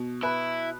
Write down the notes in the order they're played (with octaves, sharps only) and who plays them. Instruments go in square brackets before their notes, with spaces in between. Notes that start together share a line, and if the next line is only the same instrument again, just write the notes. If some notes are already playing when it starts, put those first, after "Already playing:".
Already playing: [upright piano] B2
[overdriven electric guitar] E4 [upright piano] B4